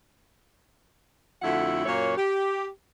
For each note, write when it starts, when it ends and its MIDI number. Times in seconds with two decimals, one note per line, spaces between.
1.42 1.84 41
1.42 1.84 50
1.42 1.84 57
1.42 1.84 64
1.42 1.84 66
1.42 1.84 78
1.86 2.14 42
1.86 2.14 46
1.86 2.14 58
1.86 2.14 73
2.16 2.64 67